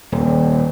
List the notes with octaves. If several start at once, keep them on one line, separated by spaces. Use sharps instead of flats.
D#1